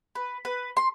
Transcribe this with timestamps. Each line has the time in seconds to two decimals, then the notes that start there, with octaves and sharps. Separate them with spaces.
0.15 B4
0.45 B4
0.77 C6